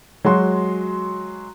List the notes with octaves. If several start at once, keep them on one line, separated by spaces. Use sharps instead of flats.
F#3 G#3 F#4 C6